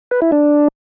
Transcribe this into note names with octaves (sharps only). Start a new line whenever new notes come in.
B4
E4
D4